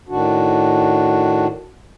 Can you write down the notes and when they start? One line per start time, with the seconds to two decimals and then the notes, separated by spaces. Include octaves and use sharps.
0.09 A2 D#3 D4 F#4